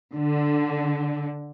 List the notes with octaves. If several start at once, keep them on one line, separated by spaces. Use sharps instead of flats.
D3